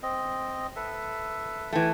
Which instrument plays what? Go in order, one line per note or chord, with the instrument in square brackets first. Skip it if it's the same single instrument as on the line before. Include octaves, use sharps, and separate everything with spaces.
[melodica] C4 D#5
A4 B4 E5
[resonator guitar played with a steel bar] E3 A3 [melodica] G5